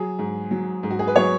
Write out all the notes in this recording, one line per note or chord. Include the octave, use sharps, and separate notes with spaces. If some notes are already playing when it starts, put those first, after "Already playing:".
Already playing: F#3 G#4
G#2
F#3
G#2
F#4
G#4
B4
F#3 G#4 C#5